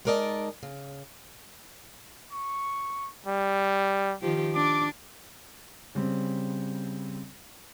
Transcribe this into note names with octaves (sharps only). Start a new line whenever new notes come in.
G#3 D#4 A#4 D5 D#5 A5
C#3
C#6
G3
D#3 F3 G4
D4 D6
C#3 G3 C4